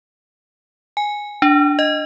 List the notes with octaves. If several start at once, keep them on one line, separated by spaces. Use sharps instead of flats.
G#5
D4
D#5